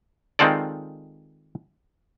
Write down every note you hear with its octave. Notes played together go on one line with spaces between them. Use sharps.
D#3 G#3 C4 F4 A4 D5